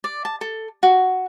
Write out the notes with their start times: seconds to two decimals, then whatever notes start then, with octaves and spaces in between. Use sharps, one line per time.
0.04 D5
0.25 A5
0.41 A4
0.83 F#4